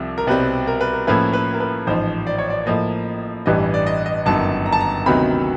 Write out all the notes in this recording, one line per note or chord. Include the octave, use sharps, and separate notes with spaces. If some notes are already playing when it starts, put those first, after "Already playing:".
Already playing: C2 C3 F3
A#4
C2 B2 G3 C4 B4
A#4
B4
A#4
A2 F3 A#3 C#4 E4 B4
B4
A#4
B4
A1 G#2 F3 C5
D5
C#5
D5
A2 F3 A#3 D#5
A1 G2 E3 G3 D#5
D5
D#5
D#5
G1 F#2 D#3 A5
A#5
A5
A#5
D2 C3 D#3 F#3 B3 B5